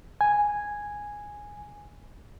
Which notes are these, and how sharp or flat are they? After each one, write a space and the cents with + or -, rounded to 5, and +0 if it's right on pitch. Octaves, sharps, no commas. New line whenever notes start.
G#5 -5